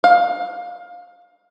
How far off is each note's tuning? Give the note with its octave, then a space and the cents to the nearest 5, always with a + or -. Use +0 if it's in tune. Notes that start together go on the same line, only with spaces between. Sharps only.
F5 +20